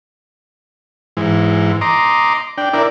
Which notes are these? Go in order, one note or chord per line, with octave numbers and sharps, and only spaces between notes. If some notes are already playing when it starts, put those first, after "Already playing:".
G#2 E3
D#5 A#5 C6 D6
D4 G5
D4 E4 A#4 D5